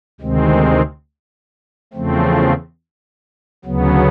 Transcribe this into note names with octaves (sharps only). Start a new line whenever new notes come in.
D2 C3 D#3 G#3 C4
E2 C#3 F3 A3 C4
D2 C#3 F#3 B3